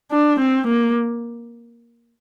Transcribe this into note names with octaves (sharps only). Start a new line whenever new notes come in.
D4
C4
A#3